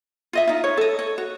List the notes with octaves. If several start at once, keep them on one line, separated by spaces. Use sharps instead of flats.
F4 D#5 E5
D#4 F4
C#5
A4 D#5
C#5
F#4